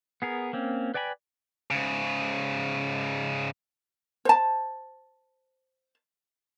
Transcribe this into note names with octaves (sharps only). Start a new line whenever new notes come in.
B3 G#4 A#4
A#3 C4 C#4
B4 D5 G5 G#5 B5
G#2 C#3
C5 A5